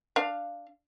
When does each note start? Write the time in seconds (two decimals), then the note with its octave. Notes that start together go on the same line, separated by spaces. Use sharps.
0.16 D4 F5